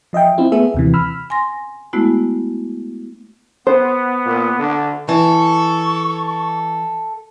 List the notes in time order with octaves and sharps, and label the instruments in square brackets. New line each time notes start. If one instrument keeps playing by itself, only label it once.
[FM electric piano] F3 D#5 E5 G5
C4 E4 F4
A3 B3 G#4 E5
D#2 C3 E3
B5 E6 F6
[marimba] G#5 C6 A#6
G#3 A3 B3 E4 F#4
[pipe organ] B3 [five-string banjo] C5
[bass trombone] A#2
D3
[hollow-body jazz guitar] E3 [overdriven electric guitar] A4 [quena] C#6